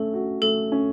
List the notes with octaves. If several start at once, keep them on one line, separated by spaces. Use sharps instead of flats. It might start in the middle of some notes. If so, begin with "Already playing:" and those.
Already playing: A3 C#4 A4
F#4
A3 A4
C#4